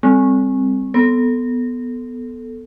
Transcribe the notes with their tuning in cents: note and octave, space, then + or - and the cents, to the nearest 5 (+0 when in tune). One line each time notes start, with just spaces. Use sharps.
G3 +25 C4 +0
B3 +0 A4 +0